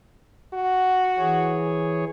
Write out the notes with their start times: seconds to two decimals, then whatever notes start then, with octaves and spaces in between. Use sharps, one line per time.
0.54 F#4
1.18 E3 G#4 C#5